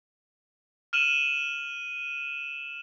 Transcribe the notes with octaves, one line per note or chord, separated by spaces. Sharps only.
F6 D#7 E7 F#7